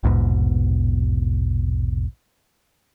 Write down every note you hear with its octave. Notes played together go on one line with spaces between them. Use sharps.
A#1 E2 G#2 B2